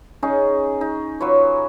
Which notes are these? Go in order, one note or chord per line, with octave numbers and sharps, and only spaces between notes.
C#4 D#4 G#4
D#4
F#3 F4 B4 C#5